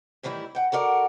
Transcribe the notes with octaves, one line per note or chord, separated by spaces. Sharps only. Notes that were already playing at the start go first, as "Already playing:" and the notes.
A2 D#3 E3 G3 E4
F#5 G5
F#4 A4 A#4 D5 F#5